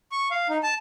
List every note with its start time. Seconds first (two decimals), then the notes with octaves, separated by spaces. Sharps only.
0.12 C#6
0.31 F5
0.49 D#4
0.63 A5